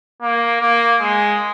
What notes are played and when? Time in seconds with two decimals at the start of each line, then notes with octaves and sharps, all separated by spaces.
0.22 A#3
0.61 A#3
1.00 G#3